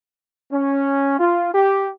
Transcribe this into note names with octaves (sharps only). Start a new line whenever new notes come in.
C#4
F4
G4